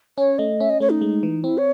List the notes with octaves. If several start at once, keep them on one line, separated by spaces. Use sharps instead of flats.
C#4 C#5
A3 D#5
C#4 E5
D#5
A3 C#5
D#4
G#3
E3
C4 E4
C#5